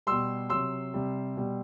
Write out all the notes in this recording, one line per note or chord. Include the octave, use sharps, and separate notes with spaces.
B2 G3 C6 E6
C3 F#3 C6 E6
C3 G3
B2 G3